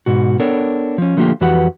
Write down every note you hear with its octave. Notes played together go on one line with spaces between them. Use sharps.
G#2 B2 F#4
B3 D4 A4 A#4 C#5 G5
F3 C#4
D3 F3 A3 A#3 F4 G4
F2 E3 F#4 G4 B4 F#5